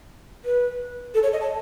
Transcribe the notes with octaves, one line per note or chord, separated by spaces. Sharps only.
B4
A4
C#5
D#5
A5